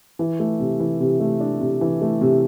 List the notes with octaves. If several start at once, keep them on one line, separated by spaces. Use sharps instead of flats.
E3
A3
C3
E3
C3
A3
D4
C3
E3
A3
C3